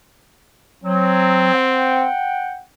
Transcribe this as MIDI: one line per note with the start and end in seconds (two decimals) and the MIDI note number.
0.84 1.50 54
0.84 2.08 60
1.52 2.57 78
1.52 2.57 79